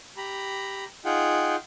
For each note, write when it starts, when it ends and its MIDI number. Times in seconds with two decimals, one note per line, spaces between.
0.17 0.84 67
0.17 0.84 82
0.17 0.84 83
1.05 1.56 63
1.05 1.56 65
1.05 1.56 68
1.05 1.56 78
1.05 1.56 79